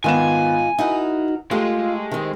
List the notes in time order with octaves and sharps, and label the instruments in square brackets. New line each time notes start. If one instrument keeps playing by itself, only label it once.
[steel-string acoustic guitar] G#2 F4 [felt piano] D#3 B3 E7 [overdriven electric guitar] G#5
[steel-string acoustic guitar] D#4 F#4 A#4 [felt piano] E4
[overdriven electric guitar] G#3 [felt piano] A3 G4 [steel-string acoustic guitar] F4
[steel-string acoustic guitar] D#3 C4